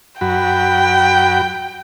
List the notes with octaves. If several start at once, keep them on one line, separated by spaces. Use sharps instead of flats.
F#2 F#4 G5 B5